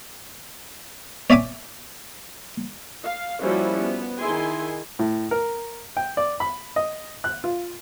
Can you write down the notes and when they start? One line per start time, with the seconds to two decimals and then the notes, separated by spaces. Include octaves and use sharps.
1.30 C#5 D5 E5 G#5 D6
3.05 F5
3.41 F3 G3 A#3 C#4 E4 F#4
3.81 B3
4.19 D#3 D#4 E4 G#4 G#5 C6
4.99 A2
5.31 A#4
5.97 G5
6.17 D5
6.40 B5
6.76 D#5
7.24 F#6
7.44 F4